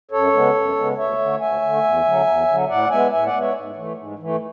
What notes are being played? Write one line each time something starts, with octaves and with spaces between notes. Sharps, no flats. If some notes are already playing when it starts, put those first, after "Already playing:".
F#2 A4 C#5
C#3 G#3 B3
F#2
C#3 G#3 B3
D2 C#5 E5
D3 A3
D2 E5 G#5
D3 A3
E2
D3 F#3
E2
D3 F#3
A2 D5 F#5
G#3 B3 E5 G#5
A2 E5 G#5
D5 F#5
G#3 B3
C#5 E5
G#2
E3 A3
G#2
E3 A3